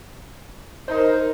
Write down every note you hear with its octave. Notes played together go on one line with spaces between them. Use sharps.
D#4 A#4 C5